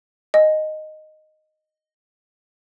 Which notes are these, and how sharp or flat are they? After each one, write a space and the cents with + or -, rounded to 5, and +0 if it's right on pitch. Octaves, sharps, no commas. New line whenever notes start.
D#5 -5 G#5 -5